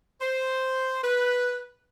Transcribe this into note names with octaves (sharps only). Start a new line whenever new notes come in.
C5
B4